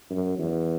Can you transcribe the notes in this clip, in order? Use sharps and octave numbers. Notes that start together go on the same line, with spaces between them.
F#2
E2